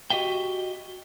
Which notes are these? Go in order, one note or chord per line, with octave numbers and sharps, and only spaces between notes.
F#4 G4 D#5 E5 G5